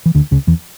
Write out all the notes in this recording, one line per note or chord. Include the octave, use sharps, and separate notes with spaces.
E3
D2 D3
C#2 C#3
E2 E3